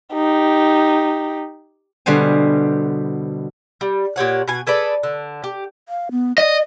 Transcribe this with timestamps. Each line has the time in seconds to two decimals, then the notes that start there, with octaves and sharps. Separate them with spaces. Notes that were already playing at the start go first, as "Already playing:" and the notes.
0.13 D#4 G4
2.06 B2 D3 G3 C5 G#5
3.81 G3
4.16 A#2 G4 C#5 F#5
4.48 B2 G#5
4.67 G#4 A4 B4 D5
5.03 D3
5.44 G4
5.89 F5
6.11 B3
6.38 D5 D#5